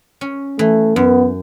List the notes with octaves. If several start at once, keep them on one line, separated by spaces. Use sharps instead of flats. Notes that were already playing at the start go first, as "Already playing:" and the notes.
C#4
E3 A3
F#2 B3